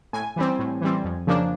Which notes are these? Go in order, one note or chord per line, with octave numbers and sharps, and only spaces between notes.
A2 G#5
E3 G3 C4
A2
E3 G3 C4
F2
C#3 F3 A#3 D4